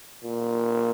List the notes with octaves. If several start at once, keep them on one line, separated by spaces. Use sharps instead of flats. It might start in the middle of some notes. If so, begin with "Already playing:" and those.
A#2